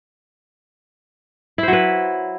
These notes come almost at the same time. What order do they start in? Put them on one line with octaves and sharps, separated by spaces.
E4 C5 F#3 B4